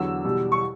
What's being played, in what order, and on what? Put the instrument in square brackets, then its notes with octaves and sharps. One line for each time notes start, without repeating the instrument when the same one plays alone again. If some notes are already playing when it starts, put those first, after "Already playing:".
Already playing: [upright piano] E2 D3 F#3 E6
E2 B2 G3
C#6